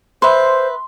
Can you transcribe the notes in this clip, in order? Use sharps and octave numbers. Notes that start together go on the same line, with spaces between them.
B4 C5 E5 C6